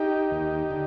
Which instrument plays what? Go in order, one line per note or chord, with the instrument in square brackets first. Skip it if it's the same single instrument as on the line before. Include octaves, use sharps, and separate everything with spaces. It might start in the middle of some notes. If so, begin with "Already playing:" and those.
Already playing: [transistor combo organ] D#4 G4
D#2
D3